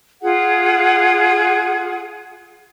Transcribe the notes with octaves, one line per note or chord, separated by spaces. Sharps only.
F4 G#4 F#5